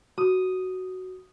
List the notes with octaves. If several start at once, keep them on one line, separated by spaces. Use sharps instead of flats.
F#4 D#6